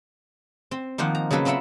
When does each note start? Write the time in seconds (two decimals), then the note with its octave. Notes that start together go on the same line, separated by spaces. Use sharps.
0.71 C4
0.98 D#3 F3 A#3 F4 F#5
1.15 A#5
1.31 C#3 F#3 A#3 A4 B4
1.45 C4 F4 A#4 E5 F#5 B5